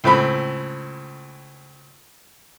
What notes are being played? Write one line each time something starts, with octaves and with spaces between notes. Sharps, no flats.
C#2 A2 C4 B5